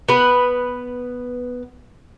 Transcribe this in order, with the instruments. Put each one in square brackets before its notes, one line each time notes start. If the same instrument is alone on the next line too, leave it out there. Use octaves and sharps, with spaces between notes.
[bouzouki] B3 B4